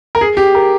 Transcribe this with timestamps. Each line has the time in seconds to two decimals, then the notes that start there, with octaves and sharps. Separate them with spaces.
0.15 A#4
0.21 G#4
0.37 G4
0.55 A#4